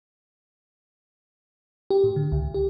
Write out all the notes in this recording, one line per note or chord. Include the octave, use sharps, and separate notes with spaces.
G4
A2
D3
C#2
G4